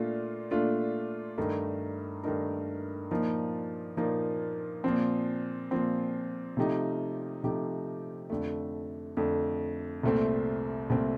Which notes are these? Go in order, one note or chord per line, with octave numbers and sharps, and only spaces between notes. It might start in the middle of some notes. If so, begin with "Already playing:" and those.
Already playing: A#2 A3 D4 F4
A#2 A3 D4 F4
G2 D#3 A3 D#4 A#4
G2 D#3 A3 D#4 A#4
A#2 F3 A#3 D#4
A#2 F3 A#3 D#4
A#2 F3 C4
A#2 F3 C4
C3 F3 A3 D#4 G4
C3 F3 A3 D#4 G4
F2 D3 A3
F2 D3 A3
C2 A#2 A3 C4
C2 A#2 A3 C4